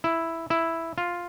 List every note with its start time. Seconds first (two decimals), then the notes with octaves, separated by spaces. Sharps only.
0.04 E4
0.50 E4
0.98 F4